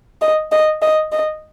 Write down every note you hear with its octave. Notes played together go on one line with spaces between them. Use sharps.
D#5
D#5
D#5
D#5